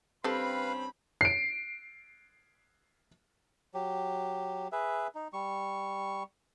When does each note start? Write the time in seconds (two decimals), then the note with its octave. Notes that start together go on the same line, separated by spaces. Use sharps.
0.24 G2 G3 C4 C#4 A4 B4 F5 B5
1.21 C7 D7
3.74 F#3 G4
4.72 G#4 B4 E5
5.15 D#4
5.33 G3 C#6